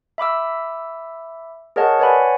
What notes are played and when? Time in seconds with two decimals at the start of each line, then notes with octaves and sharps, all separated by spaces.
0.18 E5 B5 D6 E6
1.76 G#4 A#4 C#5 D#5 F#5 A5
2.00 B4 C#5 D5 F#5 G#5 B5